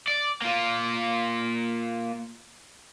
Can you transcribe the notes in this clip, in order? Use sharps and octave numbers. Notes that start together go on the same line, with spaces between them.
D5
A#3 F4